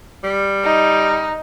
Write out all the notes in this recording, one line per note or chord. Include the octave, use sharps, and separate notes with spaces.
G3
D#4